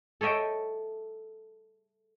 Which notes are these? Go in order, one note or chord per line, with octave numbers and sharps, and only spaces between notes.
A4 C#5 D#5 E5 G5